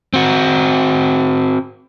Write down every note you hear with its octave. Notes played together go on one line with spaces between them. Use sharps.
C4 F#4